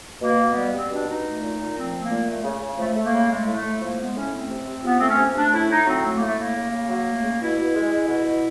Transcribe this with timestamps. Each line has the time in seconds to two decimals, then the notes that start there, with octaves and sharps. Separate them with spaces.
0.21 B2 A#3
0.39 B2
0.47 B3
0.56 G3
0.73 G3 C4
0.90 B2 D4
1.07 B2 D#4
1.25 A3
1.41 A#2
1.59 A#2
1.76 F3 C4
1.93 A3
2.01 A#3
2.10 A#2
2.27 A3
2.44 C#3
2.62 C#3
2.78 F3 A3
2.95 A3
3.05 A#3
3.13 C#3
3.29 G#3 A3
3.46 A2
3.55 A3
3.63 A2
3.81 F3 A#3
3.98 G#3 B3
4.15 A2 C#4
4.32 A3 C4
4.49 C3
4.67 C3
4.84 F3 B3
4.97 A3 C4
5.09 C#4
5.17 C3
5.35 A3 D4
5.52 A2 E4
5.69 A2 D#4
5.86 F#3 C4
6.03 A3
6.16 A#3
6.20 A2 A3
6.37 A3 A#3
6.56 C#3
6.72 C#3
6.89 F#3
7.06 A3
7.24 C#3
7.40 B2 E4
7.58 B2
7.75 G#3
7.92 G#3
8.08 B2
8.26 B2